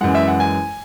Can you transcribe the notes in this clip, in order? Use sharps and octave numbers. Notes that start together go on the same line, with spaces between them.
F#2 E3 G#3 F#5
E5
F#5
G#5